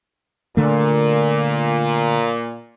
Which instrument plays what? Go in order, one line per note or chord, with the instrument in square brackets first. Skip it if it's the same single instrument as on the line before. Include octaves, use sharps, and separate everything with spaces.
[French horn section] A#2 [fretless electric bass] D3 A3